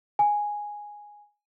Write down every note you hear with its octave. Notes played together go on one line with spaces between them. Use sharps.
G#5